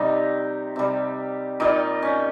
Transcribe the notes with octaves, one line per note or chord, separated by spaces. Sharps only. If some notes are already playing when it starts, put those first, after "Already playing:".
Already playing: C3 G3 D#4
C3 G3
A#2 G3 D#4
C#4